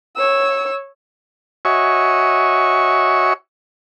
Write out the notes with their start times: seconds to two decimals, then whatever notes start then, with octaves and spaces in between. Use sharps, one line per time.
0.16 C#5 E6
1.65 F#4 C#5 D#5 E5 G#5 C#6